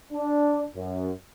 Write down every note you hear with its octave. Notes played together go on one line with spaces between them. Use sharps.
D4
F#2